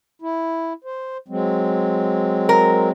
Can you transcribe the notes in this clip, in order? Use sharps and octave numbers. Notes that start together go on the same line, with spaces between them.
E4
C5
F#3 G#3 C4
A#4